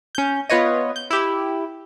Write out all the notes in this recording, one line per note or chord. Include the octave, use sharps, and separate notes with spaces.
C#4 G6
B3 F4 B4 C#5 D#5
G6
E4 G4